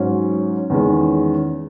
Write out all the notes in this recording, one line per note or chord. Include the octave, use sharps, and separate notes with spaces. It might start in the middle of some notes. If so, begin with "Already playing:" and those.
Already playing: G#2 F#3 C#4
E2 D#3 G#3 C#4